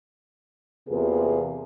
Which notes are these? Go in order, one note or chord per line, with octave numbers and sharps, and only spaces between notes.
E2 C3 A#3 F4 G#4 B4